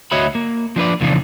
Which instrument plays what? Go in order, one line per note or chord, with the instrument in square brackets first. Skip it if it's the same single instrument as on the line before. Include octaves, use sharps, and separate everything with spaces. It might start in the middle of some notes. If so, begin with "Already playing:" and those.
[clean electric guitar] D2 F#4 C#5 D#5 E5 B5
A#3
F3 D4 B4 D5
F2 A#2 C#3 E3 F3 D4